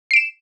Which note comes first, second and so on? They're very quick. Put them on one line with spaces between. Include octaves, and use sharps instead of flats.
C7 D7 E7